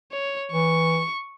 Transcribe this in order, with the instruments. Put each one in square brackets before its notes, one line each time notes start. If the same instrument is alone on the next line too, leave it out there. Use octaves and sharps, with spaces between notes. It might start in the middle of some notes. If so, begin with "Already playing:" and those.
[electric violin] C#5
[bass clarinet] E3 [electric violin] C#6